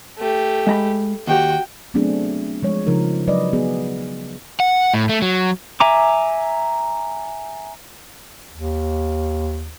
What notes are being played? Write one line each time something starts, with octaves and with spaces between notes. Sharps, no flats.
A3 G4
G#3 A#5 B5
D#2 F#4 G4 G5
F#3 A3 B3 C4 D4 G#4
F3 G#3 C#5
C#3 F3 D#4 A#4
F#3 B4 D5 D#5
B3 G#4
F#5
A2
A3
F#3
E5 G#5 A#5 D6
D#2